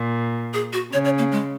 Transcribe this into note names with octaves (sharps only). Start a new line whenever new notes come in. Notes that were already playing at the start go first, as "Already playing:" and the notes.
Already playing: A#2
G#4
F#4
C#3 C#5
C#5
A#3
G#3